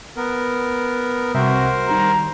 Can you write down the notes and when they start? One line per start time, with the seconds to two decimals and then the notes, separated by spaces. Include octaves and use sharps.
0.17 B3 A#4
1.35 C2 C4 F#4 A#4 C5 E5
1.89 D#3 G3 A#5